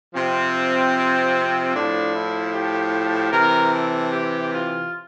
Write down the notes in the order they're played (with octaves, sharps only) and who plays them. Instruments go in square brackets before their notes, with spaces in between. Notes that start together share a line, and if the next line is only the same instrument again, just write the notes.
[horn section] C3 F3 C4
A2 F3 D4
E4
G4
C3 E3 A#4
A4
G4
F4